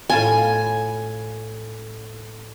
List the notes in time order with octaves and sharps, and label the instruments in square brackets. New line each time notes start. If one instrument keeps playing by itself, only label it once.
[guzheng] A2 F4 A5 [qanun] G#5